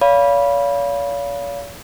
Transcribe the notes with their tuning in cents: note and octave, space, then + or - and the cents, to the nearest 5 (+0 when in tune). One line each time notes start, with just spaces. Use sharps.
C#5 +45 F5 -10 B5 -15